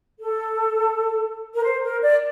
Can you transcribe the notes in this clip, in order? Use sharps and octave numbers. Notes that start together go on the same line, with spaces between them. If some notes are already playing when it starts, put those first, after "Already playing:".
A4
A#4
C5
A#4
D5